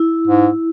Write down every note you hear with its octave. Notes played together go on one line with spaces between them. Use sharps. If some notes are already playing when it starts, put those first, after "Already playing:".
Already playing: E4
G#2